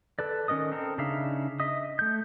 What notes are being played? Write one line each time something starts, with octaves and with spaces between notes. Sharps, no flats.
A4 B4 D5
D#3 C#4 A#4 D#5 D#6
C4 A4 A#4
C#3 D4 D#4 E5 F5
D#5 E5 D#6
A3 G6